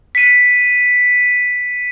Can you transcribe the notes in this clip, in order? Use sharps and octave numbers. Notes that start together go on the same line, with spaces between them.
B6 C#7 D#7